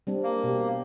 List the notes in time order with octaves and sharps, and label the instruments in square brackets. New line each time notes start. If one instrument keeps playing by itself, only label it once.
[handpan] G3 C4 D4
[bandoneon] A#3
[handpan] B2 G4